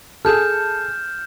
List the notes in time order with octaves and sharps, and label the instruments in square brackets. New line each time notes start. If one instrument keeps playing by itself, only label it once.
[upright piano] G#4 A4 [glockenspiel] F6 G6 E7